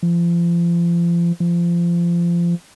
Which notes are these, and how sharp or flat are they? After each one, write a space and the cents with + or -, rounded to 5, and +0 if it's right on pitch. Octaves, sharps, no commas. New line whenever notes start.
F3 -35
F3 -25